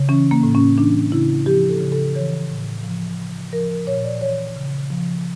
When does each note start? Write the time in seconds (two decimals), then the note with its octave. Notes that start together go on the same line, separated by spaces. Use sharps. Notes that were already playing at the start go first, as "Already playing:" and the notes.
Already playing: C#3
0.09 E3 C#4
0.31 A#3
0.43 A2
0.55 C#4
0.77 E3 D4
1.12 C#3 E4
1.46 F3 G4
1.69 A4
1.81 C#3
1.92 A4
2.15 E3 C#5
2.50 A2
2.84 F3
3.18 C#3
3.53 F3 A#4
3.70 A#4
3.87 A#2 C#5
4.04 D5
4.21 E3 C#5
4.56 C#3
4.90 F3